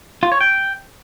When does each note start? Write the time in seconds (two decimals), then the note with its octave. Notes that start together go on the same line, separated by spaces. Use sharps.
0.23 F4
0.32 C#5
0.41 G5